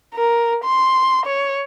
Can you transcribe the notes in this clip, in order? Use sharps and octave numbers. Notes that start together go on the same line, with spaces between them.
A#4
C6
C#5